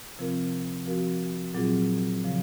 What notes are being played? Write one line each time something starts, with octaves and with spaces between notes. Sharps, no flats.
C3 F3 C4 F4 A#4
F3 C4 F#4 A#4
A#2 F#3 C4 F4 G#4
C#3 F3